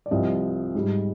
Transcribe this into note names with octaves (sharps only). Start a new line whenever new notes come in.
D5
C2 C3 F3 D#5
G#2 G3